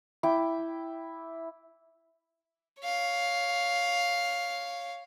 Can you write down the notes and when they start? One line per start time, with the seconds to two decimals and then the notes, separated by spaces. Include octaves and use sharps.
0.23 E4 G5 D6
2.82 C#5 F5